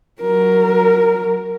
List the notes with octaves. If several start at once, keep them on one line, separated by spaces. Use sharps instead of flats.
F#3 A#4